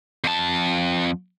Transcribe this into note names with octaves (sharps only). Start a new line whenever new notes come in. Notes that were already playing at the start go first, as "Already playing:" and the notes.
F2 A5